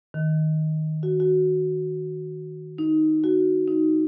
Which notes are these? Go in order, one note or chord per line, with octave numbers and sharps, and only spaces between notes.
D#3
F#4
F#4
D#4
F#4
D#4